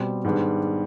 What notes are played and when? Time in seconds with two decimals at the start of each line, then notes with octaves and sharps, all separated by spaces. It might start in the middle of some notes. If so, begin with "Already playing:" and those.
Already playing: B2 G3 C4
0.24 G#2 D#3 G3 B3 D4